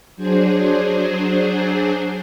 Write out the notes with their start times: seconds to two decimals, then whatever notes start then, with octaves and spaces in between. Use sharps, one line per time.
0.16 F#3 D4 G#4 C5